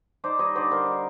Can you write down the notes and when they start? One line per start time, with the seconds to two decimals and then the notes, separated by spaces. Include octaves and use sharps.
0.24 D#4 C5 D5
0.39 G3 C#5 D#5
0.55 D3 C5 D5
0.71 D3 A#4 C5
0.86 D#4